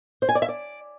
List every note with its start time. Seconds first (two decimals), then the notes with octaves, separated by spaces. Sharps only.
0.22 C5
0.29 G#5
0.35 D5
0.42 E5
0.49 D5